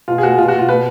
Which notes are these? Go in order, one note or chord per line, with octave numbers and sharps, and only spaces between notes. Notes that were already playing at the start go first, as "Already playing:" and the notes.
B2 F4
G#4
B2 F#4
B2 F4
F#4
B2
F4
B2 B4